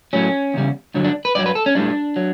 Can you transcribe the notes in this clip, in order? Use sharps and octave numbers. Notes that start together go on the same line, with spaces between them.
A2 F#3 C#4
E2 C#3 G3
G2 D3 F#3
D4
B4
G2 F#3 D5
B4
A4
C#4
A2 G3 D4
F#3